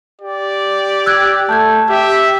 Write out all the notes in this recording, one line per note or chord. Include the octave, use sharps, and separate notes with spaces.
G4 D5
E6 F#6 G#6
A3 A5 G6 G#6
G4 E5